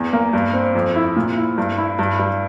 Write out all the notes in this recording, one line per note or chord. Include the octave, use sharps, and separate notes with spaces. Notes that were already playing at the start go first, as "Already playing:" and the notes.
Already playing: E2
A#3
G2
C4
F2
E4
A#2
E4
G2
E4
G2
G2